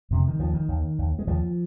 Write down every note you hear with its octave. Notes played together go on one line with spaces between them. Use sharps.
F2 C3
D#3
D#2 F3
D#3
D#2
D#2
G#3
D#2 F3